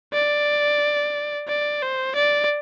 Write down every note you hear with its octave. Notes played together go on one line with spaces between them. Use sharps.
D5
D5
C5
D5